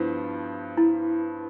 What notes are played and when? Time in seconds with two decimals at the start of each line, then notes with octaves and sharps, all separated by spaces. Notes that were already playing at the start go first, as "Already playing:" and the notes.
Already playing: G2 F3 B3 E4 C5
0.77 E4